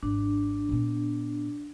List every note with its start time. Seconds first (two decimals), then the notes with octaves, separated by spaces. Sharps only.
0.03 G#1 D4
0.69 A#2 B3